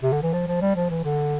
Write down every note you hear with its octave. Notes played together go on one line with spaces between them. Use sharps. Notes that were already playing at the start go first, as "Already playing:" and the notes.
C3
D3
E3
F3
F3
G3
F3
E3
D3